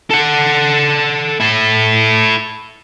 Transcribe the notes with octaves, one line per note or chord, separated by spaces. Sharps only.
A4 F#5
E4 A4